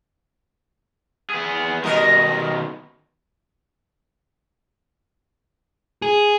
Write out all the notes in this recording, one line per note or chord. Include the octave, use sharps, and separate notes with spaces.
B3 G#4
B2 D#3 G3 A#4 D#5
G#4